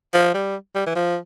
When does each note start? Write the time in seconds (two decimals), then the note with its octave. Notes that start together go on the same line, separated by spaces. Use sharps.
0.14 F3
0.34 G3
0.75 G3
0.86 E3
0.95 F3